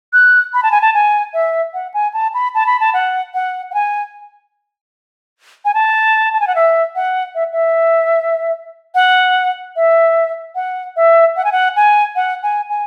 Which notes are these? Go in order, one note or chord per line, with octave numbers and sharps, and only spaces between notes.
F#6
B5
A5
G#5
A5
G#5
E5
F#5
G#5
A5
B5
A5
B5
A5
F#5
F#5
F#5
G#5
G#5
A5
A5
G#5
F#5
E5
F#5
E5
E5
F#5
E5
F#5
E5
F#5
G#5
F#5
G#5
F#5
G#5
G#5